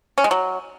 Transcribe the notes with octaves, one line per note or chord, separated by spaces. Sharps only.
C#4
G#3
F#3